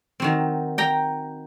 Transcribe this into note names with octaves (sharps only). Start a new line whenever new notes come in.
D#3 F#3 C4
G5 A#5